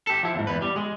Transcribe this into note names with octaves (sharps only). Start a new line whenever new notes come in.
G4 A4
F3 E4
E2 G#2
E2 B4
G3
G#3